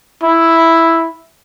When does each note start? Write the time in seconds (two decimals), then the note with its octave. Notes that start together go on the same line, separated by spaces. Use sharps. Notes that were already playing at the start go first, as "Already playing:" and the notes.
0.23 E4